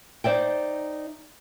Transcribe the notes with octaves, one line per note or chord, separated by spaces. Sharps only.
D#4 C5 D5 E5 G5